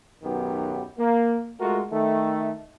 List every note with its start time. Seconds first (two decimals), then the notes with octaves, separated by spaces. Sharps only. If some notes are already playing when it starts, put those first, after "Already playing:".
0.23 B1 F#2 D#3 B3 G4
0.98 A#3
1.60 G#3 A3 F4 F#4 A#4
1.91 D#3 A3